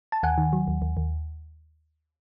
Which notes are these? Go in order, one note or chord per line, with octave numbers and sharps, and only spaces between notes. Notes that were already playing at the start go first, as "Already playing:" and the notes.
A5
D#2 F#5 G#5
D#3
F#3
D#2
D#2
D#2